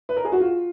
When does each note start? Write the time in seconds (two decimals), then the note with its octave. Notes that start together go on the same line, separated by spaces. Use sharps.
0.09 B4
0.17 A#4
0.25 G#4
0.32 F#4
0.40 F4